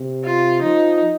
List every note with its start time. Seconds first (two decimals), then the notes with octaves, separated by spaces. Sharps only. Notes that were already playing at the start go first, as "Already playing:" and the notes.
Already playing: C3
0.25 F4
0.62 F3 D#4